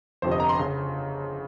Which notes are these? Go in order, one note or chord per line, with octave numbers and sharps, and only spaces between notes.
G1 F2 C3 C5
D#5
A#5
C6
C#3